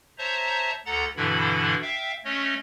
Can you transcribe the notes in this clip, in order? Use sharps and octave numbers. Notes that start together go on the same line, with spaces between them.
C5 C#5 E5 A5 A#5
D2 A4 F#5 A#5 A6
G2 B2 D3 E3 E4 B5
E5 F5 G5
A3 C#4 C#5 D#5